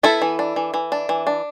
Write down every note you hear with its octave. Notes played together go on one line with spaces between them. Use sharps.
B3 E4 A4
E3
D4
E3
E3
D4
E3
D4